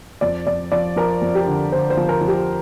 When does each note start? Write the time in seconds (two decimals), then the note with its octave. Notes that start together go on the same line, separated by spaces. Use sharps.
0.21 F2 D5
0.47 F2 D5
0.72 F3 D5
0.96 F3 A#4
1.22 F2
1.35 G4
1.47 D3
1.72 D3 C5
1.90 C5
1.97 F3
2.09 A#4
2.21 F3
2.28 G4